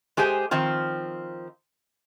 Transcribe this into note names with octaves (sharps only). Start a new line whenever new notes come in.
G#3 G4 G#4 C5 G#5
D#3 F3 C4 F4